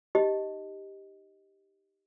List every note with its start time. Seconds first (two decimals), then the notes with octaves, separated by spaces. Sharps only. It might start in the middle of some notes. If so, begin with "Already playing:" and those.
0.15 D#4 G4 D#5